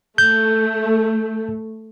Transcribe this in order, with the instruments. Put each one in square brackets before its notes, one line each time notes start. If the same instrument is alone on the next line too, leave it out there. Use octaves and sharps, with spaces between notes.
[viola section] A3 [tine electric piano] G6